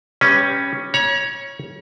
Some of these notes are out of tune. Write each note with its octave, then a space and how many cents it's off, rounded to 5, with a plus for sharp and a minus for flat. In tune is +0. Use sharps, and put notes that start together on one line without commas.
G3 +10 C#4 +0 B4 +20
C#5 +0 A#5 +45